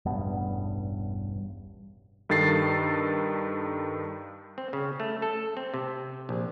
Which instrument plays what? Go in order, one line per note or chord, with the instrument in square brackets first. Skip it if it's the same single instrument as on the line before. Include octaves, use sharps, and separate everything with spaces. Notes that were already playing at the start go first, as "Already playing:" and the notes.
[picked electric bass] E1 A1 G2 B3
[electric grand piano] G2 D#3 A4 A6 C7
[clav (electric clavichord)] C4
C#3
A3
A4
C4
C3
A#1